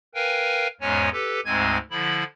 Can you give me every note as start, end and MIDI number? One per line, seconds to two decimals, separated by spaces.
0.15 0.67 70
0.15 0.67 71
0.15 0.67 77
0.15 0.67 79
0.15 0.67 80
0.81 1.09 40
0.81 1.09 44
0.81 1.09 56
0.81 1.09 61
0.81 1.09 73
0.81 1.09 80
1.12 1.40 67
1.12 1.40 69
1.12 1.40 71
1.45 1.78 38
1.45 1.78 44
1.45 1.78 56
1.45 1.78 60
1.45 1.78 80
1.45 1.78 92
1.91 2.24 50
1.91 2.24 53
1.91 2.24 64
1.91 2.24 83